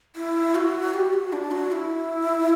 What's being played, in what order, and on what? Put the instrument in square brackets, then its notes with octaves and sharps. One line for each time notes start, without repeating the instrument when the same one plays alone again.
[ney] E4
F#4
G4
F#4
D4
F#4
E4